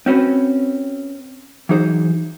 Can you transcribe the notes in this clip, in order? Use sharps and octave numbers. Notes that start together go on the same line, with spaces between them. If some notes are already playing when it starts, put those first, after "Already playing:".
C4 C#4 F#4 B4
E3 F#3 D#4 G#4 C5